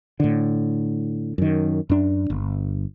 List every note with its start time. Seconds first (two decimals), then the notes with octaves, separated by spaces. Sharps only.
0.20 A2 D3
1.38 F#2 D#3
1.90 F#2 D4
2.30 G1